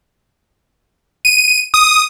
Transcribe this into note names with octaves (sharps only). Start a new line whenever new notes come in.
D#7
D#6